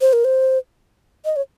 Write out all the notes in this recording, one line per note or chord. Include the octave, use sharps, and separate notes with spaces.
C5
A#4
C5
D#5
C#5